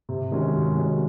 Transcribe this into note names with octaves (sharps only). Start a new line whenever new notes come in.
C3
D#3 G#3 C#4 F#4
C3
D#3 G#3 C#4 F#4